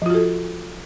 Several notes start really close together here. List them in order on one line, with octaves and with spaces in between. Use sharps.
F3 F4 F#4 A4